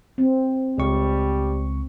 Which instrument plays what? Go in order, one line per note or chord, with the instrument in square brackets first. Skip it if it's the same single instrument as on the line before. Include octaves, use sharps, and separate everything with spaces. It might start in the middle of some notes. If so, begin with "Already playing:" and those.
[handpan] C4
[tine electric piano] C#2 C#6 [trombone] G3